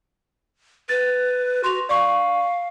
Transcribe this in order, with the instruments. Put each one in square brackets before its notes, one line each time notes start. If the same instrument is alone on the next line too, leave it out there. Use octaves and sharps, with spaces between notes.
[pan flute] B4 [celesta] A6
[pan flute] F#4 [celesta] C6 F7
[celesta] D5 C#6 [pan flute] F5